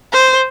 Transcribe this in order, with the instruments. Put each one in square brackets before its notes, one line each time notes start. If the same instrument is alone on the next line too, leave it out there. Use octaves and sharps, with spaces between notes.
[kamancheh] C5